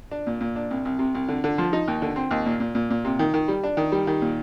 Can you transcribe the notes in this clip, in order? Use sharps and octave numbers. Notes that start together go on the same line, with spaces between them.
D4
A#2
A#2
D4
C2
C2
C3
C2
D3
D3
F3
D#4
D#2
D3
C4
D#2
A#2
A#2
A#2
A#2
C3
D#3
D#3
G3
D4
D#3
G3
D#3
A#2